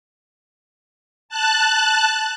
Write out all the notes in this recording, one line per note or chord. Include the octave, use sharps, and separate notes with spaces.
A5 F#6